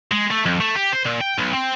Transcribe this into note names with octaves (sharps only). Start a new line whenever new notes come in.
G#3
A3
F2
A3
G4
C5
A#2
G5
B1
C4